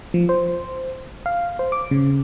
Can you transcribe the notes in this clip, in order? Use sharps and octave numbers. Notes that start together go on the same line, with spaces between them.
F3
C5
F5
C5
D6
C#3